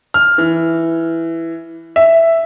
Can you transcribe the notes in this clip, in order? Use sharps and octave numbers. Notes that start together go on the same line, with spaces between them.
F6
E3
E5